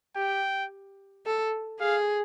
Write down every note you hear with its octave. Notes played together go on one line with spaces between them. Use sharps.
G4 G5
A4
G#4 F5